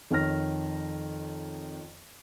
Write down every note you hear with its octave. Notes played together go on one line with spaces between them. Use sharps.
F2 D#3 C#5 F6 A#6